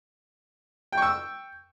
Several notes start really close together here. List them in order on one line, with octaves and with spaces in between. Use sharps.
G5 C#6 E6